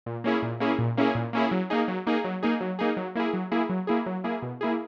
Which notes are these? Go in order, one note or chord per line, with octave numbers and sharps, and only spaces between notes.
A#2
A#3 C#4 E4 G#4
A#2
A#3 C#4 E4 G#4
A#2
A#3 C#4 E4 G#4
A#2
A#3 C#4 E4 G#4
F#3
A#3 D#4 G#4
F#3
A#3 D#4 G#4
F#3
A#3 D#4 G#4
F#3
A#3 D#4 G#4
F#3
A#3 E4 G#4
F#3
A#3 E4 G#4
F#3
A#3 E4 G#4
F#3
A#3 E4 G#4
B2
A#3 E4 G#4